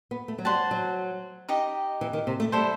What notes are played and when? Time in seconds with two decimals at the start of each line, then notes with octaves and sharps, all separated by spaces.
0.11 B3
0.28 A3
0.39 F#3
0.45 G3 C5 F#5 A5
0.71 F#3
1.49 D#4 G4 D#5
2.01 E3
2.13 D#3
2.27 C3
2.40 A3
2.52 G3 E4 A4 C5